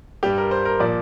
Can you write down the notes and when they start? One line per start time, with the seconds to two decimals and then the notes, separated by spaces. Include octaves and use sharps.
0.23 G2 G3 G4
0.38 A#4
0.51 C5
0.65 A#4
0.80 A#2 F3 D5